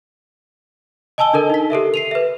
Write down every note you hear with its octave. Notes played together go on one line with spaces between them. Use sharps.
D#5 G#5 A5 E6 G7
D4 A4 A#4 D#5
D#4 B6
G4 A4 A#4 E5
C7 D#7 F7
B4 E5